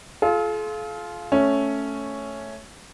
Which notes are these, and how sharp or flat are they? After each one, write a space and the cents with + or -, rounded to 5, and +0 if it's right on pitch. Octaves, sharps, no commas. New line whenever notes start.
F4 +0 A4 -45
A3 +0 C#4 +0